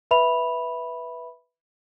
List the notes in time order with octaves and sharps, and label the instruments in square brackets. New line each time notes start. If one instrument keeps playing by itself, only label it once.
[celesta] B4 E5 B5 F7